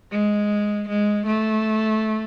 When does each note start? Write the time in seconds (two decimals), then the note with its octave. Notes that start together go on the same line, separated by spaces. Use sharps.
0.11 G#3
0.88 G#3
1.26 A3